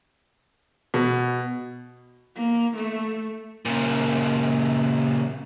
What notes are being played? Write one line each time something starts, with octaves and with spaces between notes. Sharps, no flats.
B2
A#3
A3
A#2 C#3